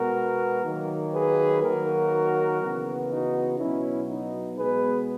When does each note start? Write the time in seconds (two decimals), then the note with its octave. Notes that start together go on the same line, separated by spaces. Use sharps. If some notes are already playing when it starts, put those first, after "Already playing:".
Already playing: B2 G#3 B3 F#4 A#4
0.64 D#3 F#3 A#3
1.14 G#4 B4
1.62 D#3 F#3 A#3 F#4 A#4
2.61 C#3 E3 B3
3.09 D#4 F#4
3.59 B2 F#3 B3 C#4 E4
4.08 D#4
4.57 B2 G#3 B3 G#4 B4